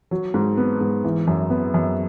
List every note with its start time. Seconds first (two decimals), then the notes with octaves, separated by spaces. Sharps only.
0.11 F#3
0.34 G#2
0.57 B3
0.80 G#2
1.04 E3
1.27 F#2
1.50 B3
1.74 F#2